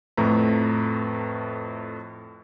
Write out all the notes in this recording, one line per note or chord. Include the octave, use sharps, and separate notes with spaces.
F2 A2 A3 B4 A#5